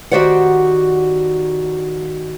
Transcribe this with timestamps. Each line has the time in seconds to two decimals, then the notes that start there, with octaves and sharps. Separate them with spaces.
0.11 D#3 F#4 G4 C5 D5 F#5